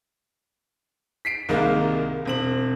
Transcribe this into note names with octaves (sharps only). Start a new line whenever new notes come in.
B6 C7 D7
C2 D#3 G#3 A#3
E1 C4 F#7